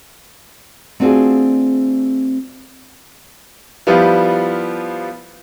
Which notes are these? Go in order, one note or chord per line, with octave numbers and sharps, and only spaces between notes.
A3 C4 D4 F4 F#4 G#4
F3 G3 B3 E4 F4 G4